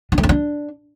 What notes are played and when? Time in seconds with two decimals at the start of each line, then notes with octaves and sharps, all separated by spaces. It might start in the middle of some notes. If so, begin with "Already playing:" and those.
0.12 D4
0.18 A3
0.23 C#4
0.29 D4